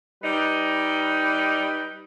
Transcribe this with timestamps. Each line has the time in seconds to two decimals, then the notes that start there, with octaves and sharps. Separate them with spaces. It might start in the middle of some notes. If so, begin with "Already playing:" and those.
0.23 G3 D#4 B4